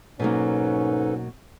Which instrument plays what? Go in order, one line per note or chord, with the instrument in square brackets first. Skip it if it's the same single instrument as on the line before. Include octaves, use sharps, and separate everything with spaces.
[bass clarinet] G#2 [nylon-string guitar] B2 F#3 A#3 [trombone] C#4 [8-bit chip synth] D#4 A4 B4